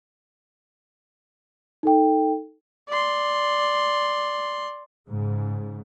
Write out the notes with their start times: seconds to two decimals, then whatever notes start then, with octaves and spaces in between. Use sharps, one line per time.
1.83 D#4 A4 G5
2.89 D5 C6
5.06 G#2 C#3